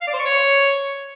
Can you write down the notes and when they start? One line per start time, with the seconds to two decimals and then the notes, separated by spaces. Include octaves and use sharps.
0.02 F5
0.08 D5
0.14 C5
0.19 C#6
0.25 C#5